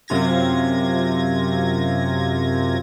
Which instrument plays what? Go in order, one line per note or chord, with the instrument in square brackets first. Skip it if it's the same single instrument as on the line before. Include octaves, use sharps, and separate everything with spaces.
[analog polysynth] F#2 C3 F4 G#6 A#6